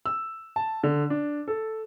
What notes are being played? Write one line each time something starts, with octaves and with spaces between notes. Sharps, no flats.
E6
A5
D3
D4
A4